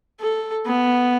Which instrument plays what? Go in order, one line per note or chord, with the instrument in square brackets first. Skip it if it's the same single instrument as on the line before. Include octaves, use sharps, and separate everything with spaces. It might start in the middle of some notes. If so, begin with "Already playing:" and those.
[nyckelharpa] A4
B3